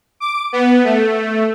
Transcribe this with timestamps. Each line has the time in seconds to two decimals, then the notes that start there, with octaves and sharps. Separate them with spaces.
0.20 D6
0.53 B3
0.84 A3